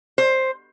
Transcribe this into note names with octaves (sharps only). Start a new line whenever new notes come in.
C5